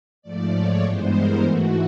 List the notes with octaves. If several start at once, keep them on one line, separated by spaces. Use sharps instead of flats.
G#2 F3 A3 D5
C#5
G2 E3 G#3 B3 C5
A#4
G#2 E3 A3 F#4